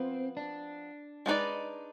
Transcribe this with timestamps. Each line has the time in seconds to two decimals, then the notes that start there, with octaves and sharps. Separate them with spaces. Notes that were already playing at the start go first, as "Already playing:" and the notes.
Already playing: F3 B3 C4
0.37 D4
1.26 G#3 B3 D#4 B4 D5